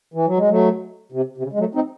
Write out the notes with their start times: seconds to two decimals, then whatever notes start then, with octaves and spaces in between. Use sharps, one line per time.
0.14 E3
0.26 F#3
0.37 G#3
0.50 F#3 A3
1.12 C3
1.37 C3
1.43 C#3
1.53 G#3
1.59 F#3 A3
1.75 C4 D#4